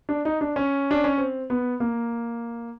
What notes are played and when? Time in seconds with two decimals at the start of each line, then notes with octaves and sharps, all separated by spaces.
0.09 D4
0.25 D#4
0.41 D4
0.56 C#4
0.91 D4
1.04 C#4
1.18 C4
1.50 B3
1.80 A#3